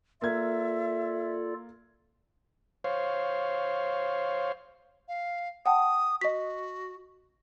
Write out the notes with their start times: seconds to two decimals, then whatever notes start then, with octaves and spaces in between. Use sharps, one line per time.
0.22 A#3 F4 A4 D5 E5 G#6
2.84 C5 C#5 F5
5.08 F5
5.66 F#5 G5 A5 D#6
6.21 F#4 D#5 B6